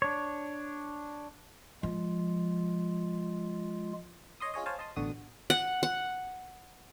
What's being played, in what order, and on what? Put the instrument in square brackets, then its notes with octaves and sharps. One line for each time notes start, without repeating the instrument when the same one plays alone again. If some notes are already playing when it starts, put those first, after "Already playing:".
[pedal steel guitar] D4 C#5
[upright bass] F3 [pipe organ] G#3 F4
[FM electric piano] C#5 D#5 C6 D#6
C#4 F4 G#4 C#5 D#5
C5 C#5 F5 G#5 A5
D#5 A5 C6 D#6
A1 B2 D3 F#4 D#6
[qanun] F#5
F#5